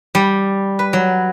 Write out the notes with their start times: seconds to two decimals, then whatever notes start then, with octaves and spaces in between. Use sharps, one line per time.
0.15 G3
0.79 B4
0.93 F#3